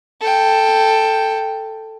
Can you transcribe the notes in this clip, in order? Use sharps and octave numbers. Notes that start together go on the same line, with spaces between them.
A4 G5